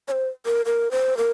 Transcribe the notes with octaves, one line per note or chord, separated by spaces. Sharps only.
C#5
C5
A#4
A#4
C5
A#4